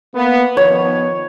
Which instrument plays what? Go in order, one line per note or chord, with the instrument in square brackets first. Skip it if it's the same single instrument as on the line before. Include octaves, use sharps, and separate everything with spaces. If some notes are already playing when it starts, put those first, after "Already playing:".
[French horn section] A#3 B3
[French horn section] D#3 F3 B3 [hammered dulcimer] C#5